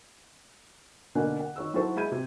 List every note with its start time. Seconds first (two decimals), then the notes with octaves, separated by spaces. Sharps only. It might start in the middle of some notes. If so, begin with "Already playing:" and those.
1.15 B2 D3 A#3 G#5 F#6
1.40 F#5
1.56 D#3 C#5 E6
1.74 F#3 E4 F#4 A4 C5
1.96 G#3 E5 B5 G6 G#6 D#7
2.12 C3